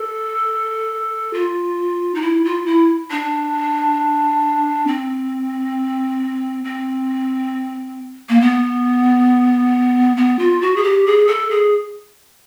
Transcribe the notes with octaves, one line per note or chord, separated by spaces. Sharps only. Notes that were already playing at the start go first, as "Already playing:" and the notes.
Already playing: A4
F4
D#4
E4
F4
E4
D4
C4
C4
A#3
B3
B3
F4
F#4
G#4
G4
G#4
A4
G#4